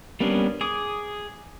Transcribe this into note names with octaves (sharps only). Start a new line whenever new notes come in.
G3 A#3 B3 C#4 D4
G#4 D6 D#6